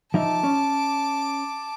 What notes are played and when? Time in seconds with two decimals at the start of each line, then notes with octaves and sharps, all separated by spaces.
0.14 F3 D#4 E5 A5 D6
0.43 C#4